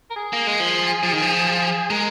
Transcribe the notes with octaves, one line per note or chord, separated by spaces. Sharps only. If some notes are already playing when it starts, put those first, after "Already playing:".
A#4
G#4
A#3
G#3
F3
F3
D#3
F3
G#3 A#4